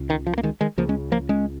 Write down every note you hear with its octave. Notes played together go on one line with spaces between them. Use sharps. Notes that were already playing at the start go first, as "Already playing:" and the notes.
Already playing: C#2 C#3
D#3
F3
A#3
D#3 G#3
D#3 G#3
C#2 C#3 F3 A#3
G#3 C#4
F3 A#3
G#3 C#4